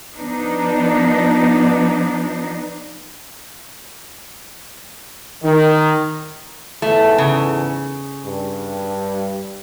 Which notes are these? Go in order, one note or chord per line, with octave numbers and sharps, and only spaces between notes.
F3 B3 D4 D#4
D#3
E2 G#2 A3 A4
C#3
G2